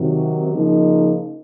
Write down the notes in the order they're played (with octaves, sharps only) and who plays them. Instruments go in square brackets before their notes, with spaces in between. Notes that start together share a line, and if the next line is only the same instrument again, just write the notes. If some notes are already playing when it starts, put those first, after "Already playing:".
Already playing: [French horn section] C3 D#3 F#3
C#3 F3 A#3 D#4